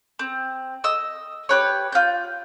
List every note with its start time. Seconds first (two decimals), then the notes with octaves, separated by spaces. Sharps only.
0.19 C4
0.84 D#5 E6
1.49 G4 B4 C#5
1.92 F4 G6